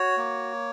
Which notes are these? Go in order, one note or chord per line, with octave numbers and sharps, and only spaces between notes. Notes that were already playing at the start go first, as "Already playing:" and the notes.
Already playing: F#4 C#5
A#3